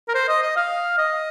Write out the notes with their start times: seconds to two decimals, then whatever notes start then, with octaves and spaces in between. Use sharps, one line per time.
0.08 A#4
0.14 C5
0.28 D#5
0.42 D#5
0.56 F5
0.98 D#5